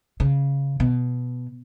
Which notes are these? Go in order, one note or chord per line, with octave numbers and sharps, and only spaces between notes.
C#3
B2